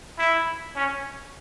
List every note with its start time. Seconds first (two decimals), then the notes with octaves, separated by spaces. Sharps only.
0.18 E4
0.76 C#4